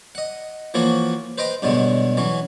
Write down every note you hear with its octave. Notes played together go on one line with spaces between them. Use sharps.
D#5 F#5
E3 F3 A#3 F#4 C#5
B4 C5 D#5 G5 A#5
G2 B2 D3 F#3 G#3
E3 F#3 C#4